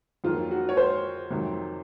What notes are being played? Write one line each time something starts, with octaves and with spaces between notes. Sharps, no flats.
F2 D#3 F#3 A#3 F4
F#4
C#5
C5
F2 C3 D#3 F#3